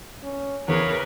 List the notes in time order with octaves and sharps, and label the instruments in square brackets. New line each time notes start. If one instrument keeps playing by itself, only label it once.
[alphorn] C#4
[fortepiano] E2 [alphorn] C#3 [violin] G#4 C#5 [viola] A#4 B4